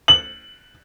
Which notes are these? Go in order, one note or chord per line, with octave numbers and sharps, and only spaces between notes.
F#7